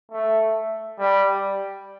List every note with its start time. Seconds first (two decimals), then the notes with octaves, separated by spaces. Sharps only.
0.12 A3
0.99 G3